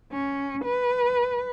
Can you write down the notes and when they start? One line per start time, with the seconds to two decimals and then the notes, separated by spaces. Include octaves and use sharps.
0.13 C#4
0.65 B4